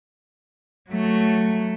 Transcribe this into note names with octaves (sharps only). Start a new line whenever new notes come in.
F#3 A3